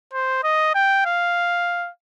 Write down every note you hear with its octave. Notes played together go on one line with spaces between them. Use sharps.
C5
D#5
G5
F5